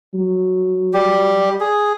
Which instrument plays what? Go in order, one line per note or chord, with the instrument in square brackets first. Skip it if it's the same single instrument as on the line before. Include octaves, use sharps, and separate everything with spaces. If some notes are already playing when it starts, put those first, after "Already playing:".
[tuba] F#3
[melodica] G3 G4
G#4